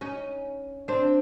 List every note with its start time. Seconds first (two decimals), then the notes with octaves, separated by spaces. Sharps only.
0.01 C#4 D#4
0.88 C4 D4